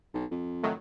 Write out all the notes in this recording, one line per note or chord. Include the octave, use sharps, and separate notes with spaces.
B1
F2
A2 D#3 F#3